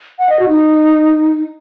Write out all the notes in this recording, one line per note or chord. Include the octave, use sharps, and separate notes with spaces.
F#5
D#5
F#4
D#4